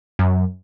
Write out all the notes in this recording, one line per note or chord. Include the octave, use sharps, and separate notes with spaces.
F#2